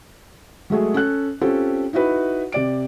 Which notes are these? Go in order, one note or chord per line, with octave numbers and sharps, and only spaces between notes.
F#3 G#3 A3 F#4 G#4
C#4 A4 F#6
C4 C#4 F4 G4 A4
D#4 E4 F#4 B4
C3 D5 D7